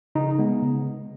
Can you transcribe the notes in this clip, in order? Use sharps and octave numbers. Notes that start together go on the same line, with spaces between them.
C#3 D#4
G#3 B3
C#3